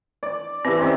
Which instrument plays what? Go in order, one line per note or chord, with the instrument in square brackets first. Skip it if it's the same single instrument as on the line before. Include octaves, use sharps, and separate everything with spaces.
[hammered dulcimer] D5
[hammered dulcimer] E3 [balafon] C4 G4
[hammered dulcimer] C3 D#3 C4 [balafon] C#4 G4